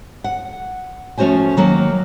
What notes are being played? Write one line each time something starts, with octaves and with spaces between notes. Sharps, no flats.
F#5
F3 A3 C#4 F#4 C5 G#5
D#3 F#3 A#3